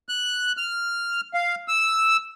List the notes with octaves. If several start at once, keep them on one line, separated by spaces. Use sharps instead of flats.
F#6
F6
F5
E6